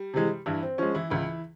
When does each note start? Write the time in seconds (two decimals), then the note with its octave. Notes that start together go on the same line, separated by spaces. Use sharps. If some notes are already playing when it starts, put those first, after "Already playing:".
Already playing: G3
0.14 C3 E3 G#3
0.46 G2 E3 E4
0.62 C4
0.78 F3 G#3 C#4
0.95 E3 E4
1.10 C#2 E3 E4